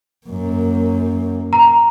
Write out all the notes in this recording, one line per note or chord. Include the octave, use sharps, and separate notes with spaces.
F#2 A#3
A#5